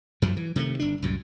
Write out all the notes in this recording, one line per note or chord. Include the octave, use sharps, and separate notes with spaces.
F#2 F3 F#3
E3
C3 D#3 G#3 A3
G1 D4
C2 F#2 A2